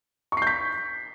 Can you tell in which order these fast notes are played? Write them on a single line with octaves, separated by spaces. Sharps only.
C#6 C7 G6 B6